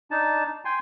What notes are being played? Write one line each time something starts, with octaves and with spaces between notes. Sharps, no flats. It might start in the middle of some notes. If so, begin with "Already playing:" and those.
D4 D#4 A5
G5 G#5 C6